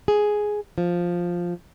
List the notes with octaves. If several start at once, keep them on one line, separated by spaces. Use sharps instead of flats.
G#4
F3